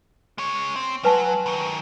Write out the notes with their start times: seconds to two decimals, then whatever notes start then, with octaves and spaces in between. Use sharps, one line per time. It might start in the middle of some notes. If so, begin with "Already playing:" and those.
0.38 G#3 C#5
0.76 C4
1.05 F#3 B4 G#5 A5
1.46 D#3 F#3